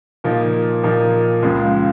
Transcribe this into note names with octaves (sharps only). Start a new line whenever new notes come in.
A#2 F3 A#3 D#4
A#2 F3 A#3 D#4
C#2 C#3 F3 G#3